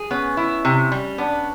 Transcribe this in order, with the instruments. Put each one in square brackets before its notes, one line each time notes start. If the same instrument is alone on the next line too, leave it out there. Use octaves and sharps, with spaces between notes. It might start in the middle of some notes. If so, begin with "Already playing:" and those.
Already playing: [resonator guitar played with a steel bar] G#4
[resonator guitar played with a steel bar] B3 [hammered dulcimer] C#4
[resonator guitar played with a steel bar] E4
C3
G3
[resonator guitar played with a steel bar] B3 [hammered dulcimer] D4